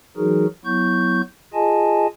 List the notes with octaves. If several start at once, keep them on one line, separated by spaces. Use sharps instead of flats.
E3 F#3 D#4 F#4 G#4 A#4
F#3 B3 E4 C#6 G6
F4 G#4 D#5 G#5 A5